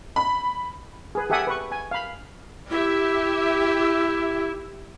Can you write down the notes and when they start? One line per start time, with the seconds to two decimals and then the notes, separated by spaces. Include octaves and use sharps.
0.16 B5
1.15 G#4 B4
1.30 G4 A4 E5 F#5 G#5 D#6
1.47 B4 C#6
1.72 G#5
1.91 F5 B5
2.71 E4 G4 E5